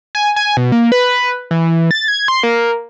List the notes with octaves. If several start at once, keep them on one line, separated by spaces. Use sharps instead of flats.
G#5
G#5
B2
A#3
B4
E3
A6
G#6
C6
A#3